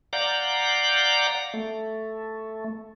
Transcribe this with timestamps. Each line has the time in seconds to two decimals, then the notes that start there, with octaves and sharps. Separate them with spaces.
0.13 D5 F5 F#5 A#5 D6 G6
1.54 A3